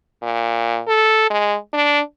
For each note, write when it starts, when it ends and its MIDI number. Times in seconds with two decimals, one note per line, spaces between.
0.23 0.81 46
0.88 1.29 69
1.30 1.56 56
1.74 2.00 62